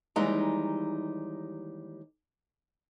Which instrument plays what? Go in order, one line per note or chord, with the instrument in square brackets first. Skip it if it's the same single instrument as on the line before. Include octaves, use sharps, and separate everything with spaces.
[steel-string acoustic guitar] D#2 E3 G3 G#3 D#4 A#5